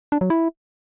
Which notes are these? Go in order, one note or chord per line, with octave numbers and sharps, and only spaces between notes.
D4
F#3
E4